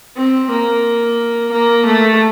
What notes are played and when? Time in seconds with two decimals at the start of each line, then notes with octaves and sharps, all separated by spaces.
0.16 C4
0.50 A#3
1.52 A#3
1.86 A3